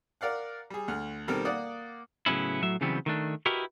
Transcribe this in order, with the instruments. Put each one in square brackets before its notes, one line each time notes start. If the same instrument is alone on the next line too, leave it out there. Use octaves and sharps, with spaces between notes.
[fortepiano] A#4 D5 F5 F#5
G3 G#4
D2 F6
B2 D#3 G3 C4 A4 A#4
A#3 D5 F#5 D#6
[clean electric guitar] A2 C#3 F#3 B3 C#4 E4
A2 F#3 E5
C#3 E3 F#3 G3 B3 C4
D#3 A3 D4
E4 F#4 G4 A#4 B4 D#5